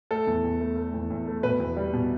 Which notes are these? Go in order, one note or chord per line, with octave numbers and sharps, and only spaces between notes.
A3 A4
E2
E2
A3
A3
E2
E2
A3
B2 B4
E2
G3
B2